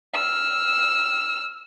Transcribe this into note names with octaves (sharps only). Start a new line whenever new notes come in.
E6 F6